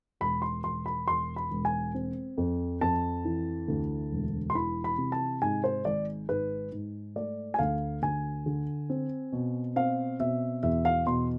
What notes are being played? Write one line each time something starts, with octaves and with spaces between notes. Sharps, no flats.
E1 B5
C6
E1 C6
B5
E1 C6
B5
E1
G#5
C4
F2
F2 A5
E3
D2
E1
C6
E3 B5
B5
C3
A5
G#2 G#5
C5
G#1 D5
G#2 B4
G#2
A3 D5
G#5
D2 F5
D2 G#5
D3
C4
B2
C4 F5
B2 E5
E2 E5
F5
B2 C6